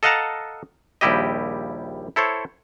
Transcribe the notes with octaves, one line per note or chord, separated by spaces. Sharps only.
A4 D#5 F5 F#5 A5 A#5
A#1 D#2 G3 E4 G4 D#5
E4 A4 C5 C#5